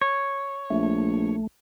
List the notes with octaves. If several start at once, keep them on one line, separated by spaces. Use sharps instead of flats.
C#5
A#1 A3